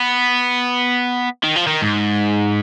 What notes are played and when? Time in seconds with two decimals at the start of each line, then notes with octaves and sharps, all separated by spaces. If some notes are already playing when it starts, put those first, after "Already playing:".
Already playing: B3
1.43 D#3
1.56 F3
1.67 D#3
1.82 G#2